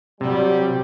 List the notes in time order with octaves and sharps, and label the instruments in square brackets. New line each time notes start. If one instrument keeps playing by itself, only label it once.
[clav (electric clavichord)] C3 [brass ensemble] F#3 G3